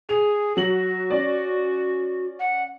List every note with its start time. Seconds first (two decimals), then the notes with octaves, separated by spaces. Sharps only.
0.09 G#4 F7
0.57 F#3 F#4 F#7
1.10 C#4 D5
2.39 F#5